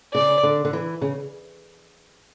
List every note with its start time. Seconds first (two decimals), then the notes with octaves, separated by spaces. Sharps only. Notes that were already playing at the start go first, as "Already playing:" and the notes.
0.14 C#3 D5
0.43 D3
0.65 D3
0.73 E3
1.02 C#3